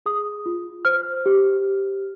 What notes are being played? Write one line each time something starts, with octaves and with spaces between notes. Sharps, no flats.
G#4 D#6
F4
C5 F6
G4